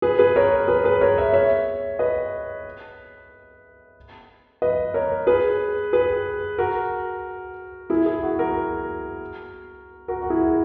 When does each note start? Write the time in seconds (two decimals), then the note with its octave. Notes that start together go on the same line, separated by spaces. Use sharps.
0.02 G#4 B4
0.19 G#4 B4
0.36 A#4 C#5
0.68 G#4 B4
0.84 G#4 B4
1.01 A#4 C#5
1.18 C#5 E5
1.33 C#5 E5
1.99 B4 D#5
4.62 B4 D#5
4.94 A#4 C#5
5.27 G#4 B4
5.93 G#4 B4
6.58 F#4 A#4
7.90 E4 G#4
8.06 E4 G#4
8.23 F#4
8.39 F#4 A#4
10.08 F#4 A#4
10.22 F#4
10.30 E4 G#4